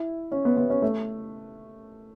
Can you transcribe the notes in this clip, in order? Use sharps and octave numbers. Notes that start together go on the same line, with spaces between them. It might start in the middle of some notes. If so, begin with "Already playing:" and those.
Already playing: E4
C#4
B3
B3
C#4
A3